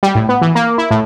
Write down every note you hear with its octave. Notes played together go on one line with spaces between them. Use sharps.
G3
A2
B3
E3
A#3
E4
A2